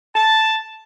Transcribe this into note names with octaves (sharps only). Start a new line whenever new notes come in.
A5